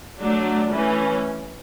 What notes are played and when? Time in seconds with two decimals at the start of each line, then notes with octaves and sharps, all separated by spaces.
0.20 F#3 A3 D4
0.71 E3 A3 C#4